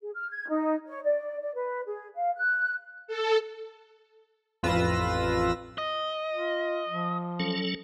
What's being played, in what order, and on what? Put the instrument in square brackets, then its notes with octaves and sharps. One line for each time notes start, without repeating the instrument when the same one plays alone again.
[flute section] G#4
F6
G#6
D#4
C#5
D5
D5
B4
G#4
F5
F#6
[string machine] A4
[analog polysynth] A1 F2 F4 B4 E6 A#6
[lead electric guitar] D#5
[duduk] F4
F3
[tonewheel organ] F#3 C#4 A4